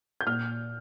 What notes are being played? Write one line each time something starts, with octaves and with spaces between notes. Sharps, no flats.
G6
A#2 F6